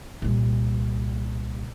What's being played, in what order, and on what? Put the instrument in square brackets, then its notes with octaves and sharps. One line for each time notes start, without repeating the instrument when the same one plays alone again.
[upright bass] C2 A#2